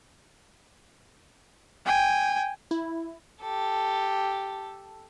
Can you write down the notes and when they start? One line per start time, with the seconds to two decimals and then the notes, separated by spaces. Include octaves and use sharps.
1.86 G5 G#5
2.71 E4
3.40 G4 A4